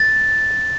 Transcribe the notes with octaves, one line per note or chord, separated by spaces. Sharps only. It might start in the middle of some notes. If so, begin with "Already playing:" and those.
Already playing: A6